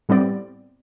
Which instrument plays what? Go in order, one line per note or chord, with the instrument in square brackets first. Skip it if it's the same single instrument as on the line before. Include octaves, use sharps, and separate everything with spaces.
[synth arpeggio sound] A2 G3 B3 C4 D5